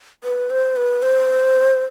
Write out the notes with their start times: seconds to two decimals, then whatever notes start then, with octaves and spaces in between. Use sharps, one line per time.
0.24 B4
0.50 C5
0.76 B4
1.02 C5